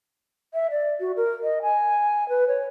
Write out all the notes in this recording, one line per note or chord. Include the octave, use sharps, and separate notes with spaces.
E5
D5
F#4
A#4
D#5
G#5
B4
C#5